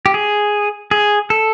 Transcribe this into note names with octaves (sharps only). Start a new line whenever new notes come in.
G4
G#4
G#4
A4